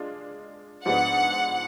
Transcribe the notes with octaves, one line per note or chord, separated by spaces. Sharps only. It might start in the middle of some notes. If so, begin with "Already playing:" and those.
Already playing: G#3 D4 F4
G#2 F3 G#3 B3 D4 F#5